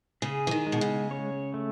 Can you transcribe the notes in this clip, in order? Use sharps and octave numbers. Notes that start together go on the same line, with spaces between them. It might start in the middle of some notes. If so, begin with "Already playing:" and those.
C#3 G#4
E3
D#3
G#3
B2
C#3
C#5
A3